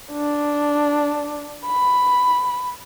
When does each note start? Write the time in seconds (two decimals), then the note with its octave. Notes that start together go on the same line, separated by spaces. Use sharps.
0.13 D4
1.67 B5